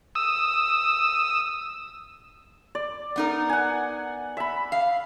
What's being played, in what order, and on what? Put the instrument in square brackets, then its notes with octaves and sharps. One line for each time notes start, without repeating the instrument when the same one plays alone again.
[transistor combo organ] D#6 E6
[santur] D5
[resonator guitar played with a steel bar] B3 D#4 A#4
[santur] F#5 G#5
E5 B5
[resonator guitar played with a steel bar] F5